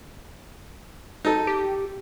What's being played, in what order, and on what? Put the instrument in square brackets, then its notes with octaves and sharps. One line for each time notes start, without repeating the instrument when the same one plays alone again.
[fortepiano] D#4 A4
[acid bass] G4